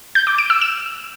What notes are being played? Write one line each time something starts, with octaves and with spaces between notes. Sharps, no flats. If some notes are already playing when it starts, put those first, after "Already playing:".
G6
D6
D7
E6
E7